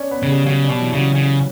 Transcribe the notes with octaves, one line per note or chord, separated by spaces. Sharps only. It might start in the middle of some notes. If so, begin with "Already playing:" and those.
Already playing: C#4 D4 C#5 D5
B3 B4
C#3
G3 G4
C#3 F#3 F#4
D4 D5
B2
E3 E4
C#3 F#3 F#4
C#3